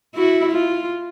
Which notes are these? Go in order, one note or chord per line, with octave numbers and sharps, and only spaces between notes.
E4 F#4
F4